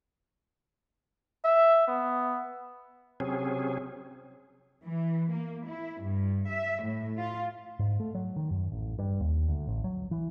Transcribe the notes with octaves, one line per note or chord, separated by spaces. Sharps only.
E5
B3
C3 F#3 C4 C#4 G#4
E3
A#3
E4
G2
E5
A2
F4
G#2
A3
F#3
D#3
F#2
A1
G2
D#2
D2
A1
F#3
E3